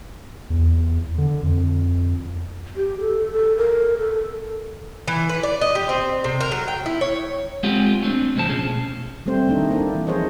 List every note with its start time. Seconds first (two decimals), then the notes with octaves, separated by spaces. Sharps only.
0.50 E2
1.18 D3
1.43 F2
2.76 G4
3.00 A4
3.33 A4
3.57 A#4
3.98 A4
5.08 E3
5.29 B4
5.43 D5
5.61 D#5
5.75 G4
5.89 C4
6.24 C3
6.40 A#4
6.52 F#3
6.68 G5
6.86 E4
7.01 C#5
7.63 G#3 C4 C#4 F4 G4 F#5
8.03 A3 C4 D4
8.36 C#2 A2 F3 C5 A5
8.49 B2 C#4 G#4
9.26 G3 A3 C4 C5
9.47 D#3 A3 D4 D#4
9.71 A#3 D4 E4
9.95 E3
10.07 F3 D#4 G#4 C5 C#5 D#5